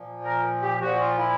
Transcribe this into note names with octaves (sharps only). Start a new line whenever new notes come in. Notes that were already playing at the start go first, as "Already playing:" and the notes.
Already playing: A#2 F3
A#4
G4
A#2 F3 F#4
F4
E4